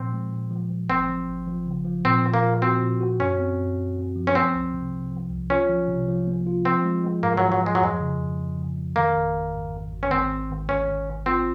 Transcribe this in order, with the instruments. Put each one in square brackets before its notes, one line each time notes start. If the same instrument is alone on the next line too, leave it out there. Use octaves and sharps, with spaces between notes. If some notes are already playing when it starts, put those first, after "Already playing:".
Already playing: [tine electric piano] A#2 F3 [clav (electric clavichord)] C4
[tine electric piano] G#3
A#2
F3
F3
[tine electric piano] G#1 [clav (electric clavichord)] C4
[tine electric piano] F3
G#1
F3
C#3
F3
[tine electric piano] A#2 [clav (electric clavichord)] C4
[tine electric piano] A#2
[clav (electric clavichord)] A#3
[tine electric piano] A#2
[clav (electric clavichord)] C4 [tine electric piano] F#4
[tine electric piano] A#2
F#4
[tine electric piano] F#2 [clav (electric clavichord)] C#4
[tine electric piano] C4
F#2
C4
C4
F3
[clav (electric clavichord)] C#4
[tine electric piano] F3 [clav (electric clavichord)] C4
[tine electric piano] C2
C3
C3
F3
C2
[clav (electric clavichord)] C#4 [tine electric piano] F4
[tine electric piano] F3
C3
F3
A#3
F4
[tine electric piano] F3 [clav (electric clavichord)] C4
[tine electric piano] G#3
G#3
[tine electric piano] G#2 [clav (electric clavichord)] A#3
[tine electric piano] G#2 [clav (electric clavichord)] F#3
[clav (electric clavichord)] F#3
[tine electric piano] F3
[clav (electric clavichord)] G#3
F#3
[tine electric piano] F2 [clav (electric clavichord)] G#3
[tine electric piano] C#3
F2
F2
C#3
F2
[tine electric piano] D#3 [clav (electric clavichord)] A#3
[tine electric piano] G#1
G#1
G#2
G#1
G#1
[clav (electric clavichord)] C#4
[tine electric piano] G#1 [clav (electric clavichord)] C4
[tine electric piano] G#1
G#1
[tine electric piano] G#1 [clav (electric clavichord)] C#4
[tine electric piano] G#1
G#1
[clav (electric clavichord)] C4 [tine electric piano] F4